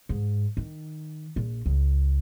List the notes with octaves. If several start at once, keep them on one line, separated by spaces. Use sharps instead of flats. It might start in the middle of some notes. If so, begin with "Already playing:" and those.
G#2
D#3
A#1
C#2